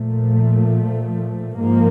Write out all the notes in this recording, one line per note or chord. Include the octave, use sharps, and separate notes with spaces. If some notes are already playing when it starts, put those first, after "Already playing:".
Already playing: A#2 F3 A3
G#2 F3 A#3